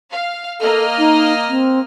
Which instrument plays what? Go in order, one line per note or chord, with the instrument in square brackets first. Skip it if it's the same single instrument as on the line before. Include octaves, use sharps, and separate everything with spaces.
[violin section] F5
[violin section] A#3 D#5 F6 [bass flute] A4
[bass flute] D#4
C4